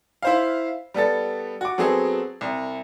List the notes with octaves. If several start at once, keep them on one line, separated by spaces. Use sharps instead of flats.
E4 C5 F5
G3 B3 A4 A6
F#4 D6
F#3 B3 C4 G#4 A4
C2